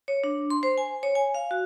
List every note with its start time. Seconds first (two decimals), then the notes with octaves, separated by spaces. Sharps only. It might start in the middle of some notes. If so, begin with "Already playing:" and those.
0.08 C#5
0.24 D4
0.50 C6
0.63 C5
0.78 G#5
1.03 C#5
1.15 G#5
1.35 F5
1.51 F#4